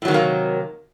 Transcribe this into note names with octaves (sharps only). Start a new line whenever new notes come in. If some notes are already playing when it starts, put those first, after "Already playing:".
A2 C3 D#3 F#3 A#3